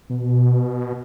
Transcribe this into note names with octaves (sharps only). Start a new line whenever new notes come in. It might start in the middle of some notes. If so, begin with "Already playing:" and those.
B2